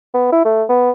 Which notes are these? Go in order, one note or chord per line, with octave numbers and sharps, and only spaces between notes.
B3
E4
A3
B3